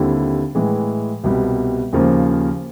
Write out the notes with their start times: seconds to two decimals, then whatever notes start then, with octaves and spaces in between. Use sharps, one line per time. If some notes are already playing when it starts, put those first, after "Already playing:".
Already playing: D#2 D3 G3 C4 E4
0.55 A2 E3 G#3
1.24 C2 B2 G3
1.93 D#2 C#3 F3 A#3